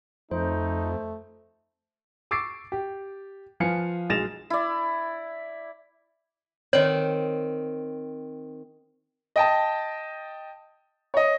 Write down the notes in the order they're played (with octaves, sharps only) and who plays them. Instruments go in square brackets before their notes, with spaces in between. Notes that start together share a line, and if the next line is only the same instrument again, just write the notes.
[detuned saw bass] F2 [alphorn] A3 [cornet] D#4 [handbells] C5
[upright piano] C#6 D6 E6 A6 C7 D7
G4
F3 B4 F5 G#5 C#7
B1 G#3 A6 A#6 E7 F7
[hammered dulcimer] E4 D5
[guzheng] D#3 C4 [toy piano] C#5
[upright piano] D#5 G5 A5
C#5 D#5